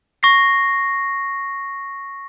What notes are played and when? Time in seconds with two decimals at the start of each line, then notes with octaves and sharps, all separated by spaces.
0.23 C#6 A#6 C7